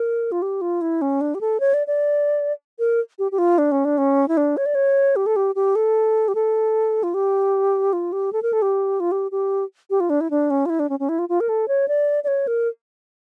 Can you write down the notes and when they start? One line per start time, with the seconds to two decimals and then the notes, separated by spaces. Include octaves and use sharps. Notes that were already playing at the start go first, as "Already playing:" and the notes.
Already playing: A#4
0.32 F4
0.42 G4
0.61 F4
0.81 E4
1.02 C#4
1.21 D4
1.35 G4
1.41 A4
1.60 C#5
1.74 D5
1.87 D5
2.79 A#4
3.19 G4
3.32 G4
3.38 F4
3.58 D4
3.72 C#4
3.85 D4
3.98 C#4
4.28 E4
4.37 D4
4.57 C#5
4.66 D5
4.75 C#5
5.16 G4
5.26 A4
5.36 G4
5.55 G4
5.75 A4
6.28 G4
6.35 A4
7.03 F4
7.14 G4
7.93 F4
8.13 G4
8.33 A4
8.42 A#4
8.53 A4
8.62 G4
9.00 F4
9.12 G4
9.31 G4
9.90 G4
10.00 F4
10.10 D4
10.21 E4
10.30 D4
10.50 C#4
10.66 F4
10.70 E4
10.80 D4
10.89 C#4
11.00 C#4
11.09 E4
11.19 F4
11.29 F4
11.40 A#4
11.49 A4
11.68 C#5
11.88 D5
12.24 D5
12.28 C#5
12.47 A#4